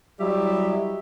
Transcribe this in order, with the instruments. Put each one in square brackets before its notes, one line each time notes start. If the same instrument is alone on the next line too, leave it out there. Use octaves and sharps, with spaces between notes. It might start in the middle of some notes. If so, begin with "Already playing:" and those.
[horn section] F#3 G3 E4 G4 D#5 E5